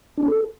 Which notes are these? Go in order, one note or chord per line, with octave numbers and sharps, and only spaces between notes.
D4
C#4
A4